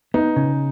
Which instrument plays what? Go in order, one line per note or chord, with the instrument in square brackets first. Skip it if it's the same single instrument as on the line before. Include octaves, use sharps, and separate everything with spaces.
[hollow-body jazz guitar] B3 [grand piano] D#4
[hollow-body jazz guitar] C#3